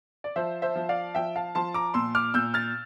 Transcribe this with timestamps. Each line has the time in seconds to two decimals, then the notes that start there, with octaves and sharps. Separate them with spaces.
0.24 D5
0.36 F3 C5 E5
0.62 C5 E5
0.76 F3
0.89 D5 F5
1.15 F3 E5 G5
1.36 F5 A5
1.55 F3 A5 C6
1.74 A#5 D6
1.94 A#2 C6 E6
2.15 D6 F6
2.34 A#2 E6 G6
2.54 F6 A6